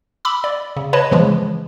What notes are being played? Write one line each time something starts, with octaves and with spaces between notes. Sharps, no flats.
B5 D6 E6
D5
C#3
B4 C#5 D#5 A5 B5
C#3 E3 F3 G#3